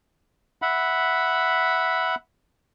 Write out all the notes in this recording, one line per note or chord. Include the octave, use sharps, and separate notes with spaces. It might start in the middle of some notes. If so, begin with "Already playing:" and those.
E5 F#5 B5